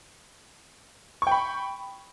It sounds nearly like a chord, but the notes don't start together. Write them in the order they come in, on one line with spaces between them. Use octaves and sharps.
C#6 G5 B5